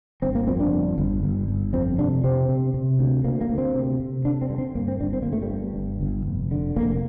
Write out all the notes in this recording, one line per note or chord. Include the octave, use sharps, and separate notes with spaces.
G1 C4
A#3
F2 C4
D4
G1
G1
G1
G1
F2 C4
C3 D4
C3 C4
C3
C3
D2
D2 A#3
A#3
D2
C4
C3
C3
D3 D4
C4
G2
C4
G2 A#3
C4
G1 D4
C4
G1 A#3
A3
G3
G2
G1
G1
F1
D3
F1 A#3